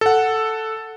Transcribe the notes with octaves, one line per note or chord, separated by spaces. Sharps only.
A4 F#5